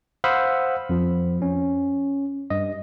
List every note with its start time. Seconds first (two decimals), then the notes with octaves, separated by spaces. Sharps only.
0.24 C5 F5 F#5 B5 D#6 E6
0.89 F2 F3
1.42 C#4
2.50 G2 D#5